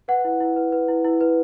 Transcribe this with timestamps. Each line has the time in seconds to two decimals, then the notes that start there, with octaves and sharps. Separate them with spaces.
0.08 B4 F#5
0.24 E4
0.40 E4
0.56 B4
0.72 B4
0.88 E4
1.05 E4
1.21 B4